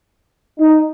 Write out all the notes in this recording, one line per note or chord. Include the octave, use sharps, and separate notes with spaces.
D#4